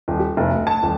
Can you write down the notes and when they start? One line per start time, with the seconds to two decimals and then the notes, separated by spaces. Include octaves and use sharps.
0.08 D#1
0.20 G4
0.37 F1
0.51 D2
0.67 A5
0.83 D#1